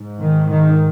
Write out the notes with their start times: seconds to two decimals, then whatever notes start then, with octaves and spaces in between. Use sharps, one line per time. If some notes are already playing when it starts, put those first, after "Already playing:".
Already playing: G#2
0.20 D#3
0.49 D#3